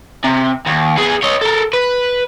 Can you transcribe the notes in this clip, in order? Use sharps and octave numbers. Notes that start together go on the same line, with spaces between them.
C3
D#2
B3 G#4
C#5 D#5
A4 A#4
B4